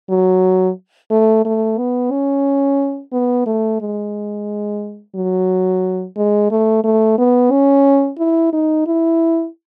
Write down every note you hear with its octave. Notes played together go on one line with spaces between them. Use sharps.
F#3
A3
A3
B3
C#4
B3
A3
G#3
F#3
G#3
A3
A3
B3
C#4
E4
D#4
E4